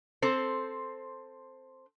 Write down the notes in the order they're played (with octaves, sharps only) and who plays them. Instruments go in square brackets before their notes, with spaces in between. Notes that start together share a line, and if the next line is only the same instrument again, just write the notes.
[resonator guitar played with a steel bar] C4 A4 C5